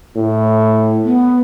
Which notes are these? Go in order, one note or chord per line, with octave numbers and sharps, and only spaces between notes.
A2
B3